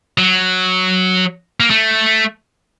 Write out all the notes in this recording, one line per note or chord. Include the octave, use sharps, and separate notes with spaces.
F#3
A#3
A3